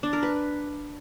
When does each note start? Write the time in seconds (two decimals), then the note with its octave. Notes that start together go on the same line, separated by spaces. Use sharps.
0.03 D4
0.13 A#4
0.23 B4